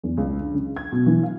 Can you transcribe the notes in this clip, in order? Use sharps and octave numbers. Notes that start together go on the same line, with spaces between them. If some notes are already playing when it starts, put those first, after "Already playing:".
E2
C#2
D3
C#3
G#6
B2
E3
F5